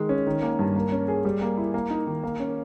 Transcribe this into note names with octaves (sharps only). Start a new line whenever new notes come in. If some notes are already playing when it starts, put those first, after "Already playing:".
Already playing: D#3 G#3
C#4
D#3
A#3
G2
A#3
C#4
G#4
G3
A#3
E4
A#3
D#4
D#3
A#3
C#4